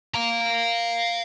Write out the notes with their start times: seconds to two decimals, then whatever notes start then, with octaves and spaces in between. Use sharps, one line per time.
0.14 F5 A#5